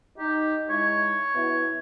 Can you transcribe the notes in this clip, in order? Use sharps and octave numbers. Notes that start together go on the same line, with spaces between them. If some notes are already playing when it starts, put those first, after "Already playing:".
D#4 G4
G#3 D#4 E4 C#5
B2 B3 E4